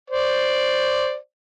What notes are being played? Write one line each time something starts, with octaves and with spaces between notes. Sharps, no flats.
C5 D5